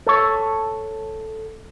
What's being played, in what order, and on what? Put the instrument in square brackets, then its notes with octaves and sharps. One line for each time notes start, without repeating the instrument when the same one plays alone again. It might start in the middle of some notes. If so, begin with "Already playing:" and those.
[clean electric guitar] A4 C#5